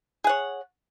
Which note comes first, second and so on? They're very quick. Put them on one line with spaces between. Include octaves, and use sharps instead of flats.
G#4 F#5 C#5